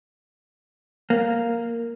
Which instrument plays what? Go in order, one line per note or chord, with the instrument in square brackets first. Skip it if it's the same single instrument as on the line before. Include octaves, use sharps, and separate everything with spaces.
[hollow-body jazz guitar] A#3